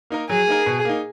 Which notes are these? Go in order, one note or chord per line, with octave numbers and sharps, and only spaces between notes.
A#3 D#4 A#4
F#3 G#4
A#3 D#4 A#4
B2
A#3 D#4